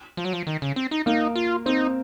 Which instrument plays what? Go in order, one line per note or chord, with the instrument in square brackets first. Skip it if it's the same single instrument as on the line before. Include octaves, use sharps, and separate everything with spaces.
[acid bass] F3
F#3
F3
D#3
C#3
C4
D#4
[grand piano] A#3 [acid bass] D#4
[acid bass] F4
[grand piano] C4 [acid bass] D#4